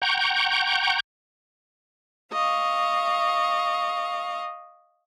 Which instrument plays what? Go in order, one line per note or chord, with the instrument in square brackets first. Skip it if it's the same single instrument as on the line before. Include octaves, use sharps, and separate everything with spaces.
[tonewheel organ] F#5 G5 A#5 C#6 G6
[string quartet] D#5 F5 C#6